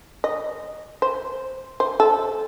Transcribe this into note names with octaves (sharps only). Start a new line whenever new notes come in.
D#5
C5
C5
A4